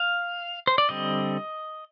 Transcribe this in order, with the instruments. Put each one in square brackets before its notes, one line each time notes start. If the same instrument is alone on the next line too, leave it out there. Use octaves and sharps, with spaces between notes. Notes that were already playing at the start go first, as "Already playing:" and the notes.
Already playing: [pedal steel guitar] F5
C5
D5
D3 G3 C4 D#5